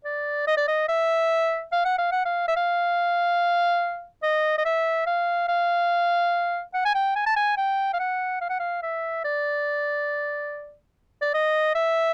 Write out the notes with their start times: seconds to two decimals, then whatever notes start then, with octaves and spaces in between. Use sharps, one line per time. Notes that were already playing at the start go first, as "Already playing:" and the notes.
0.05 D5
0.47 D#5
0.57 D5
0.68 D#5
0.89 E5
1.72 F5
1.85 F#5
1.98 F5
2.12 F#5
2.25 F5
2.48 E5
2.56 F5
4.23 D#5
4.58 D#5
4.65 E5
5.07 F5
5.48 F5
6.74 F#5
6.85 G#5
6.95 G5
7.16 G#5
7.26 A5
7.36 G#5
7.57 G5
7.93 F5
7.99 F#5
8.41 F5
8.50 F#5
8.59 F5
8.82 E5
9.24 D5
11.22 D5
11.34 D#5
11.75 E5